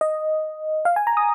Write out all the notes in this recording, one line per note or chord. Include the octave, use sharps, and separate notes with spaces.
D#5
F5
G#5
A#5
D#6